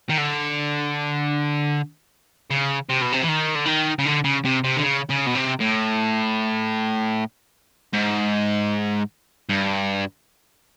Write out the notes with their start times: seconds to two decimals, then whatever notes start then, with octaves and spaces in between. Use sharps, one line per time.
0.09 D#3
0.18 D3
2.50 C#3
2.89 C3
3.01 B2
3.12 C3
3.22 E3
3.28 D#3
3.55 D3
3.66 D#3
3.99 C#3
4.05 D3
4.24 C#3
4.45 C3
4.64 C3
4.77 D3
4.83 C#3
5.09 C#3
5.26 B2
5.35 C3
5.61 A2
7.93 G#2
9.49 G2